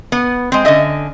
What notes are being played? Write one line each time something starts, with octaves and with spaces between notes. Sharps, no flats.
B3
G#3 C4
D3 C#4 D#5 E5